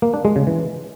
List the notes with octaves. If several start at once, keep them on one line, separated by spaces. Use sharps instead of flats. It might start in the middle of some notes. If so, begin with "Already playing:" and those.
A#3
D4
G#3
C#3
E3